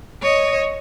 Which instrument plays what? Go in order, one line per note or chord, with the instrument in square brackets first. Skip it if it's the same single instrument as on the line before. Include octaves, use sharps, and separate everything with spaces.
[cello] C#5 D#5